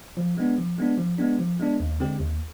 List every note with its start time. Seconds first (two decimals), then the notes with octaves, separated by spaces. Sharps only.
0.17 F3
0.37 G#3 B3 D4
0.58 F3
0.78 G#3 B3 D4
0.98 F3
1.18 G#3 B3 D4
1.39 F3
1.60 G#3 B3 D4
1.80 D#2
2.00 D3 G#3 C4 G4
2.20 D#2